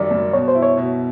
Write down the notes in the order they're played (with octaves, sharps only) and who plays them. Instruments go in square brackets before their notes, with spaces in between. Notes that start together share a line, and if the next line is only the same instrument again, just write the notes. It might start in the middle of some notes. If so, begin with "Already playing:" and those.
Already playing: [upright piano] F#2 D#3 G3 [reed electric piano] D5
[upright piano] F#2
[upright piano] B2 [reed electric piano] C#5
[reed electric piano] C5
[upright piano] E4
[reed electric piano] C#5
[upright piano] B2